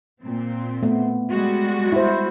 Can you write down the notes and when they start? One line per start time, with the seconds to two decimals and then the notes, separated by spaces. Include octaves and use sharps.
0.22 A#2 C4
0.83 A3 B3
1.30 G3 G#3 F#4
1.92 E4 C5